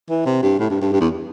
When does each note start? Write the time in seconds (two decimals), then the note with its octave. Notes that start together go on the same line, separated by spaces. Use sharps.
0.10 E3
0.26 C3
0.43 G2
0.59 A2
0.70 G2
0.82 G2
0.93 G2
1.01 E2